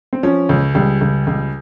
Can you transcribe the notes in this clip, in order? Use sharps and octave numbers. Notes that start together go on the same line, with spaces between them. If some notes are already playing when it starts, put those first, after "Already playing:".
C4
F3 C#4
C#2
C#2 G3
C#2
C#2